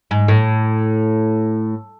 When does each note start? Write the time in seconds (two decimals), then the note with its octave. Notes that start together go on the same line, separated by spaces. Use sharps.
0.11 G#2
0.28 A2